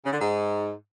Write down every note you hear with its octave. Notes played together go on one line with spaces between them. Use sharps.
C#3
D3
G#2